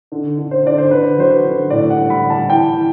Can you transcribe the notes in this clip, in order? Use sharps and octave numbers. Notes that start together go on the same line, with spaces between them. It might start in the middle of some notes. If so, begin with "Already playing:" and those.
D3
D3
C5
D3 D5
C5
D3 B4
F#3 C5
B4
D3
A2 D5
F#5
G3
B5
G3
A5
E3 G5
E3